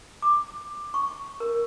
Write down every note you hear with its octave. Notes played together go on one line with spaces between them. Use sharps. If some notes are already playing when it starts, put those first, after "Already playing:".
D6
C#6
A#4